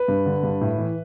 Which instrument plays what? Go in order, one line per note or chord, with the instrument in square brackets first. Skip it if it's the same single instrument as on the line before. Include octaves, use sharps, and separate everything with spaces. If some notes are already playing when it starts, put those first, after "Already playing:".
Already playing: [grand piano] B4
G2
D3
G2
A2
E3